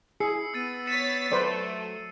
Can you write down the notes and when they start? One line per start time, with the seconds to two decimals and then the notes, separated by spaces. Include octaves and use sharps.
0.20 E4 G#4 E6 C7 C#7
0.54 B3 E6 A6 D#7
0.87 C#5 A6 B6 C#7 D#7 E7
1.32 F#3 A3 B4 C5 D5